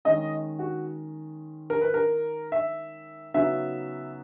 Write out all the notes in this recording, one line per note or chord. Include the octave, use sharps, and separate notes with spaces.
D#3 G#3 C#4 D#5
F#4
A#4
B4
A#4
E5
C#3 F#3 B3 D#4 E5